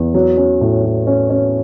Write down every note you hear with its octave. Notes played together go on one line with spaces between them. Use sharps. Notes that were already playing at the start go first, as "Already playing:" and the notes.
Already playing: E2
F#3
C#4
A2
F#3
C#4
C#4